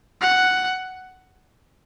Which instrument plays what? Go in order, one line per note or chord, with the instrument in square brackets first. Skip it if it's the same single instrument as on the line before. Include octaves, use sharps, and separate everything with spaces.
[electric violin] F#5